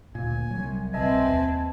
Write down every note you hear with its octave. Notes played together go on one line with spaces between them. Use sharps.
D2 A#2 G#5
C2 F#3
C2 B2 C4 B4 D#5 E5 G#5 A5
D#2 A5